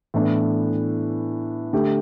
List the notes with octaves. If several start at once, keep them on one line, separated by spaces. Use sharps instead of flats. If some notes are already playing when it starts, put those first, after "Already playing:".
A2 E3 B3 D4
D3 A3 G4